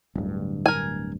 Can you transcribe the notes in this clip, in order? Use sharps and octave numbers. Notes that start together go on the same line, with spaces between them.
D1 D2 G2
A#4 G#5